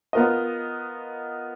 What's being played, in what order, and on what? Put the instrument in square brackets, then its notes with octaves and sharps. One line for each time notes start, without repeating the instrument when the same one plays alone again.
[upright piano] B3 F4 A#4 D#5